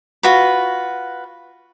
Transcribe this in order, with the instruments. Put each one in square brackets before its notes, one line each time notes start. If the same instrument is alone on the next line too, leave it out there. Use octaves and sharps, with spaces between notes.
[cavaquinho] F4 F#4 B4